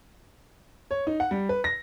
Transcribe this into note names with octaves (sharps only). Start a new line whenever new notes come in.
C#5
D#4
F#5
G3
B4
A#6